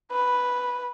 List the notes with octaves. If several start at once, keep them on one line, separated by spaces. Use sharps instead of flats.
B4